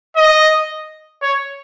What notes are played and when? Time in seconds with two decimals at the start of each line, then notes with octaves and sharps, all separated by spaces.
0.17 D#5
1.22 C#5